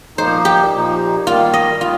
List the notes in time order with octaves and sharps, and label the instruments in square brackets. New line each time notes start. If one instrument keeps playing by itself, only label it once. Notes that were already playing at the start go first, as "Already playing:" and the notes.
[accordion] A#2 F3 A#3 D#4 [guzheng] C5
[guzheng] G4
[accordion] A#2 F3 A#3 D#4
[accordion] D#3 G3 A#3 [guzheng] F4
[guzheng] D#5
[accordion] D#3 G3 [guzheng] F4